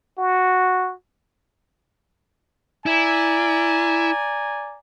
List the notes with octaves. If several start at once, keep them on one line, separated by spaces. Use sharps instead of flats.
F#4
E4 D5 G#5 A#5